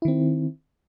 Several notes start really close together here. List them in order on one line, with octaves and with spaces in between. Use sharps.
E4 D#3 C4